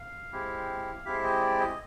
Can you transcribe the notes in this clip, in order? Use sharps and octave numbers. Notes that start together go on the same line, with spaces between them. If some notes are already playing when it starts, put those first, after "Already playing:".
Already playing: F5
G#3 C4 E4 G4
G#3 C4 E4 G4 E5
D#5
D5
D#5